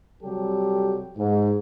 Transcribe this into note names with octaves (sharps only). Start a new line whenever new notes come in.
C3 F#3 G3 G4 A4
G#2